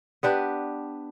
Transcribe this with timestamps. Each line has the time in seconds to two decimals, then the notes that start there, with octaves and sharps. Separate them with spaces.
0.23 B3 D4 G4 B4